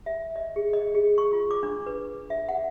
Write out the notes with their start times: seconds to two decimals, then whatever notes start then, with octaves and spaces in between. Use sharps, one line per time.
0.06 E5
0.36 D#5
0.56 G#4
0.73 D#5
0.95 G#4
1.18 C#6
1.33 F4
1.51 D6
1.63 D4
1.86 B4
2.30 E5
2.49 F#5